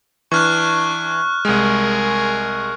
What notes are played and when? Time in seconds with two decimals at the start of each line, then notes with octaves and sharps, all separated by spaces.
0.32 E3 D4 C#6 F6 F#6
1.45 C2 G#3 G#4 A#4